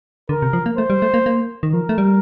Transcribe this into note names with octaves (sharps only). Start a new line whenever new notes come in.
D3 A#4
C3
F3
A#3
A3 C5
G3
A3
A#3
A#3
D#3
F3 A#4
A3
G3